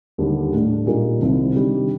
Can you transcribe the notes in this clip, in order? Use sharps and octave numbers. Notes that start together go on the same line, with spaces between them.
D#2 D3 G3 D4
A2 A3 D4
A#2 G3 A#3 D#4
C2 C3 D#3
C3 D#3 G3 D4